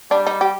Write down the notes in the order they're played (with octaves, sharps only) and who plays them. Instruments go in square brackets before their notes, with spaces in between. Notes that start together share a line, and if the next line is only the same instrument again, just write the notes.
[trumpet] G3 [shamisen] D4
[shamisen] D#4
G4